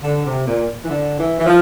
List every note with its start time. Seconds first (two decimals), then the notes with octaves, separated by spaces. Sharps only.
0.02 D3
0.25 C3
0.46 A#2
0.84 E3
0.89 D3
1.18 E3
1.39 E3
1.46 F3